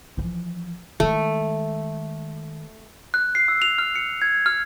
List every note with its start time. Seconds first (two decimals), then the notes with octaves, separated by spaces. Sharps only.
0.17 E3 F3
1.00 D#3 G#3 A3
3.14 F#6
3.35 C7
3.48 E6
3.62 F7
3.78 F6
3.96 C#7
4.22 G#6
4.46 F6